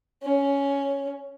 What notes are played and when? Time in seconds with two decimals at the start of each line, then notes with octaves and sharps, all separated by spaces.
0.23 C#4